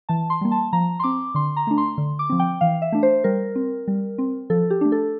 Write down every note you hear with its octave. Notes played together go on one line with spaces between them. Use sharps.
E3 A5
C6
G3 A#3
A5
F3 A#5
C6
C4 D6
D3 C6
A#5
A3 D4
C6
D3
D6
F3 C4
G5
E3 F5
E5
A3 D4
C5
G3 A#4
C4
G3
C4
F3 A4
G4
A3 D4
A4